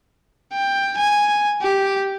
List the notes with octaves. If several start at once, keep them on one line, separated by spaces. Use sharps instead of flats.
G5
G#5
G4